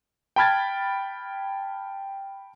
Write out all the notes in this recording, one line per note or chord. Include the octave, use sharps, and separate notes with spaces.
G5 A5 B5 F6 G#6 A6